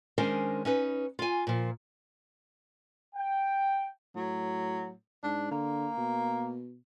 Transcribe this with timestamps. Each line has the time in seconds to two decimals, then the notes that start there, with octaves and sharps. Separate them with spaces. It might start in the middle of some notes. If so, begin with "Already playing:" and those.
0.18 D#3 G#3 C#4 D4 A#4 C5
0.65 C#4 D#4 B4
1.19 F4 G#5
1.47 A#2 F3
3.16 G5
4.16 A2 F#3
5.23 G#2 D4
5.51 D3 A#3
5.98 B2